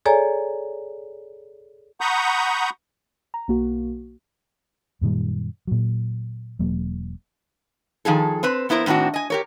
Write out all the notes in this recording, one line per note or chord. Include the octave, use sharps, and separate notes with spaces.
G#4 A4 C#5 D5 G#5 A#5
F#5 A#5 B5 C#6 D#6 G6
A#5
B1 A#3 F#4
F#2 A#2 D#3 G3
A#2 F#3
E1 F#3 A#3
D#3 F3 G#4 A4
C4 B4 C5
F2 B3 E4 A#4 C5
A2 D#3 C4 D4 F#4
D#5 G#5
G4 A#4 C#5